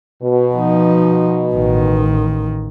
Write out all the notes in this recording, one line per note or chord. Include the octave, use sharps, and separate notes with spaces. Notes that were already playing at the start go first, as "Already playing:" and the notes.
B2
F3 D#4
A1 D#3